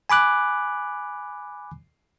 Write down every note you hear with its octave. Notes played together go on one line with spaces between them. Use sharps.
G#5 B5 D6 F#6